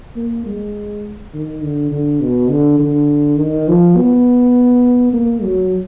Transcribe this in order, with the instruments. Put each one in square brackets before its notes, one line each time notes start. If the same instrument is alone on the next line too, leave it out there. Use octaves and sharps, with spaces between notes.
[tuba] A#3
G#3
D#3
D3
D3
B2
D3
D3
D#3
F3
B3
A#3
F#3